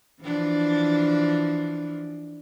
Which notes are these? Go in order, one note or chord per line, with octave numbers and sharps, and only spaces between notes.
E3 F3 D4